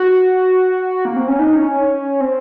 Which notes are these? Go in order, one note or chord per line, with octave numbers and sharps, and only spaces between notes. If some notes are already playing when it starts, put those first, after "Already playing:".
Already playing: F#4
A#3
C4
C#4
D#4
C#4
C4